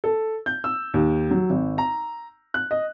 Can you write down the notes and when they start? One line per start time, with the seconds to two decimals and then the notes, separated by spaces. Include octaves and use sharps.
0.04 A4
0.46 G6
0.64 E6
0.94 D#2
1.31 F#3
1.50 G#1
1.78 A#5
2.54 F#6
2.71 D#5